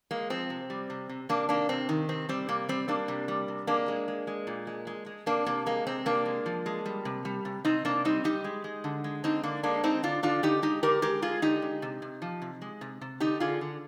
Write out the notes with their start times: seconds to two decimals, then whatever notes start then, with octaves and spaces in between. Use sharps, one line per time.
0.11 G#3 A#3
0.30 F3 C4
0.50 C3
0.70 G3
0.90 C3
1.09 C3
1.29 C3 A#3 D4
1.49 D#3 A#3 D4
1.69 C3 C4
1.89 D#3
2.09 C3 C4
2.29 G3 C4
2.49 C3 A#3
2.69 G3 C4
2.88 G3 A#3 D4
3.08 C3
3.28 G3
3.48 C3
3.67 G#3 A#3 D4
3.88 G#3
4.08 G#3
4.27 G#3
4.47 A#2
4.67 G#3
4.87 G#3
5.06 G#3
5.26 C3 A#3 D4
5.46 C3 A#3
5.66 G#3 A#3
5.86 C3 C4
6.06 C3 A#3 D4
6.26 G#3
6.46 F3
6.66 G#3
6.86 G3
7.05 C3
7.25 G3
7.45 C3
7.65 C3 C4 D#4
7.85 C3 A#3 D4
8.05 G3 C4 D#4
8.24 G3 D#4 G4
8.44 G#3
8.64 G#3
8.84 D3
9.04 G#3
9.24 D3 C4 D#4
9.43 D3 A#3 D4
9.63 G#3 A#3 D4
9.83 G#3 C4 D#4
10.03 D3 D4 F4
10.23 D3 D4 F4
10.43 D3 D#4 G4
10.62 G#3 D#4 G4
10.83 D3 G4 A#4
11.02 G#3 G4 A#4
11.22 G#3 F4 G#4
11.42 D3 D#4 G4
11.62 G#3
11.82 C3
12.02 C3
12.22 F3
12.42 C3
12.62 G#3
12.81 C3
13.01 C3
13.20 D3 D#4 G4
13.40 D3 F4 G#4
13.61 D3